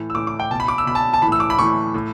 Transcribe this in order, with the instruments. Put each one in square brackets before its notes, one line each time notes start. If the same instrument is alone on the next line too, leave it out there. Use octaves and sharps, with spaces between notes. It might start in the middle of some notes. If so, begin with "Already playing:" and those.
Already playing: [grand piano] A2 E3
E6
A2 E3 D6
D6
G5
B2 A5
B5
D6
E6
B2 B5
A5
A5
E3 B5
A2
E6
D6
B5
A2 E3 C#6
A2